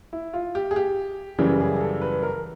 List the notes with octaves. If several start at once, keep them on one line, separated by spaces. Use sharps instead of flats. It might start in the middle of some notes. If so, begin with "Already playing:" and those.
E4
F4
G4
G#4
G4
F#2 C#3 E3 G3 G#4
G#4
G#4
A4
B4
A#4